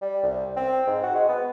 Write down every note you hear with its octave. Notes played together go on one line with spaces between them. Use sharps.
G3
C2
C4
G#2
F#4
G#3
B3